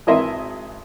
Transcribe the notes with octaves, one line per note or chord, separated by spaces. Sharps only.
G#1 E3 A#4 D#5 E5 C6